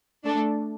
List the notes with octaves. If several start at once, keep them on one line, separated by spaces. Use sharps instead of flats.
A3 D4 A4